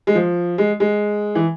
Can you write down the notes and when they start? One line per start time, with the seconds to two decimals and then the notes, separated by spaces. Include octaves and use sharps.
0.07 G#3
0.15 F3
0.58 G#3
0.80 G#3
1.35 E3